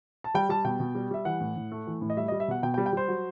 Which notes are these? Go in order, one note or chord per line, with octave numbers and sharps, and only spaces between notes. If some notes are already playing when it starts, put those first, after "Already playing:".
A5
G3 G5
G3 A5
B2 G5
B2
G3
G3 E5
E3 F#5
A2
A2
A3
E3
A2
D#5
G3 E5
D#5
G3
E5
B2 F#5
B2 G5
G5
G3
G5
G3 C5
F#3